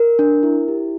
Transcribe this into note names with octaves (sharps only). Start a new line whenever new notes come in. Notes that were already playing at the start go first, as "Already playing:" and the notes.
Already playing: A#4
D4
E4
G4